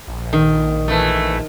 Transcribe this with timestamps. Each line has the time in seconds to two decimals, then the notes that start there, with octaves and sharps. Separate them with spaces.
0.08 A#1
0.33 D#3
0.88 E3 A3